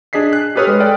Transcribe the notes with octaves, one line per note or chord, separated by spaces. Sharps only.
D4 G#4 D#5 B6 C7
F#6
G4 A4 B4 C#5 D#6 F6
G#3
A4 B4 D5 G5